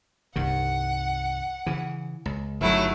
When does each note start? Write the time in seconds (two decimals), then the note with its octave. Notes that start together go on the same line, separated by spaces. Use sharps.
0.36 C2 G2 D#3 F#5
1.66 C#3 E3
2.26 C#2
2.61 G1 D#3 F#3 A3 E4